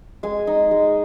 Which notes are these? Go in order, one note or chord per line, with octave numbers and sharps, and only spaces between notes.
G#3 G#5
D#4
G#3